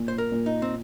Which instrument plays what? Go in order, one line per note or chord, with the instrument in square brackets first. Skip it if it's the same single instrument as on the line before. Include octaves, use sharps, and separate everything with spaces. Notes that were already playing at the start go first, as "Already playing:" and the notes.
Already playing: [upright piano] A#2
[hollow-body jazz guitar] C5
A#4
[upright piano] A#2
[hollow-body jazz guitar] D#4
C4